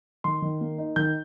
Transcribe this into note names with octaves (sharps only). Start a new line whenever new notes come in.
D#3 C6
D#3
A#3
D#4
D#3 G6